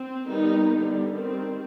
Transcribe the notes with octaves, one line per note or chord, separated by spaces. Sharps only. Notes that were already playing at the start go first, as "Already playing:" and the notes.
Already playing: C4
D#3 G3 B3 D#4
D3 G3 B3
D#3 G3 C4